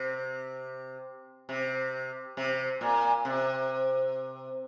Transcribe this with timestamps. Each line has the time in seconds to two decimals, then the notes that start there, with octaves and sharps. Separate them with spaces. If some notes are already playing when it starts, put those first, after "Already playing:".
Already playing: C3
1.49 C3
2.37 C3
2.81 A#2
3.25 C3